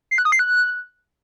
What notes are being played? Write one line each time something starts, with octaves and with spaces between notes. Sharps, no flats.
C7
F#6
D#6
C7
F#6